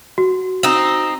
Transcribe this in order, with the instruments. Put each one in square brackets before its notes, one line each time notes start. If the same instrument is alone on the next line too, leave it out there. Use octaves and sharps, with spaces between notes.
[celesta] F#4
[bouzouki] C4 D#4